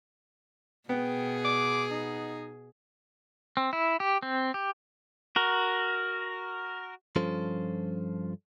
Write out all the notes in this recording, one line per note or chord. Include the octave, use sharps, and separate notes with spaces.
B2 B3 G#4 G5
D6
D#4
C4
E4
G4
C4
G4
F#4 A#4
G2 F3 C#4 F4 A4 C5